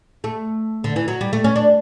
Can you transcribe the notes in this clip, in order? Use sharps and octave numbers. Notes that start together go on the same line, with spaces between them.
A3
D3
E3
F#3
G3
A3
C#4
D4